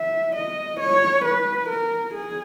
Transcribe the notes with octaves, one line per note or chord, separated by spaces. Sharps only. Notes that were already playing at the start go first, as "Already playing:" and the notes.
Already playing: E5
D#5
C#5
B4
A#4
G#4